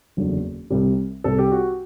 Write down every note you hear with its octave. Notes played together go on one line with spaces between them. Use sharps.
F#1 E2 D3 F#3
C2 C3 G3
C2 C3 G3 A4
G4
F#4